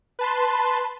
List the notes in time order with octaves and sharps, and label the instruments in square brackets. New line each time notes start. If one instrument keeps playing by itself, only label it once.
[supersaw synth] B4 A5 C6